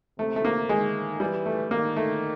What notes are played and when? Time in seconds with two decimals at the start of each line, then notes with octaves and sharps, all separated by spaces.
0.18 C3 A3
0.36 A3
0.45 A#3
0.69 D#3 G#3
1.20 E3 G3
1.46 A3
1.71 D#3 A#3
1.96 A3